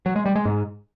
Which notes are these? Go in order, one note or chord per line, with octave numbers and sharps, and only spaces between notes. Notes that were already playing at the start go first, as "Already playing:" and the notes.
F#3
G#3
G3
G#3
G#2